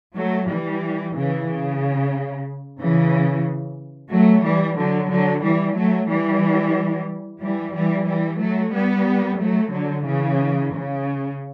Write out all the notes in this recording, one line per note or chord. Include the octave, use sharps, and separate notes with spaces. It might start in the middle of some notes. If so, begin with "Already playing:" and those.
F#3 A3
E3 G3
C#3 E3
C#3
C#3 E3
F#3 A3
E3 G3
D3 F#3
D3 F#3
E3 G3
F#3 A3
E3 G3
E3 G3
E3 G3
E3 G3
F#3 A3
G3 B3
F#3 A3
D3 F#3
C#3 E3
C#3